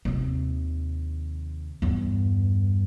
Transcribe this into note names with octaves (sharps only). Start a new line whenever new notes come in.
D#2 C3
E2 G2